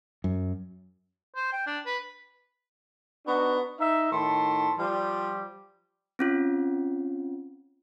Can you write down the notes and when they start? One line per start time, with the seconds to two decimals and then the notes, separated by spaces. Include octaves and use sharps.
0.24 F#2
1.36 C5
1.53 G5
1.66 D4
1.86 B4
3.27 B3 D4 D#4 F#4
3.79 D#4 E5
4.12 A2 D#3 A5 C6
4.78 F3 G3
6.19 C4 C#4 F4